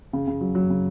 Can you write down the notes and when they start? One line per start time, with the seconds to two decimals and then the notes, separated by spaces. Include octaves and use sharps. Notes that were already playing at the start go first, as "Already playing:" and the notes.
0.13 C#3
0.27 C#3
0.41 F#3
0.55 F#3
0.70 C#3